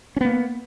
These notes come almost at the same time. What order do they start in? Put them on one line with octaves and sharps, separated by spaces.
C#4 B3 A#3